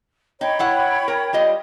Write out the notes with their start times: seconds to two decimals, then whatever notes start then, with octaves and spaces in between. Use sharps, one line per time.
0.41 D#4 C#5 G5 B5
0.59 F#3 E4 F#5
1.08 A#4
1.33 G3 F4 D#5